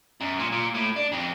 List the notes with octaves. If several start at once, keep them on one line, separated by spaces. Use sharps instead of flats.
F#2
A#2
A#2
A2
D4
F2